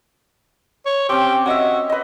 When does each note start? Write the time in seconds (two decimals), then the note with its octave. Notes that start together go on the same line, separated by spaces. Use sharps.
0.86 C#5
1.09 C4 C#4 G4
1.46 F#4 C#5 D#5 E5
1.90 B4 D#5